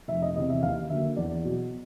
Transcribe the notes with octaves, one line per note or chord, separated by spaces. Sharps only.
F1 E5
D#5
E2 C3 D#5
E5
D#2 F5
D3 F#3 A#3 E5
E2 D5
B2 F#3